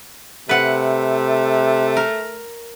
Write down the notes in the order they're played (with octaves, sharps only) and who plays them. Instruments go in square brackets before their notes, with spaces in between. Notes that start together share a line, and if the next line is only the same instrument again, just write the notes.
[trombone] C3 [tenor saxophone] A3 [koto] B4 F#5
[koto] A#4